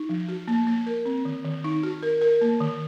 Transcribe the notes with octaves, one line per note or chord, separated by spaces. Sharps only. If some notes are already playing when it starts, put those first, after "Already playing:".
Already playing: D#4
F3
F#4
A#3
A#3
A#4
C4
D#3
D#3
D#4
F#4
A#4
A#4
A#3
D#3